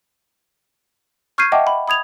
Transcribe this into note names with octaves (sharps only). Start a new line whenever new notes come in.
C#6 F6 G6 G#6 C7 D#7
D#5 E5 F#5 G5 A5 D6
B5
B5 D#6 G#6 F7